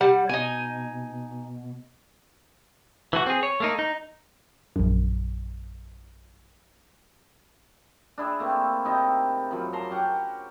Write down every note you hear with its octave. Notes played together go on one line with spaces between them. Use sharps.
G3 F#5
B2 D#4 G#5
E3 A3 F#4
C4 G#4
C#5
A3 A#3 D#4
D#4
A#1 F#2
D4 E4 G#4
A3 A#3 C4
C3 D#4 E4
F#2 F3 B5
A5 A#5 C6 D6
C#4 G4 F#5